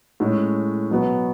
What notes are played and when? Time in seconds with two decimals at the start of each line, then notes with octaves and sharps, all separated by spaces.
0.20 A2 G#3 C#4
0.90 B2 F#3 B3